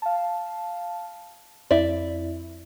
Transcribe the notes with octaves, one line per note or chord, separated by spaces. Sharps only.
F5 A5
F2 E4 D5 E5